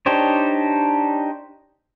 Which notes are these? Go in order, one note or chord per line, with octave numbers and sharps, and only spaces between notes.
D4 D#4 G4 C5 C#5